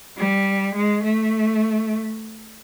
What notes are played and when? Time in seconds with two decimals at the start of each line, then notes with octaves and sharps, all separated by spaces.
0.16 G3
0.74 G#3
1.03 A3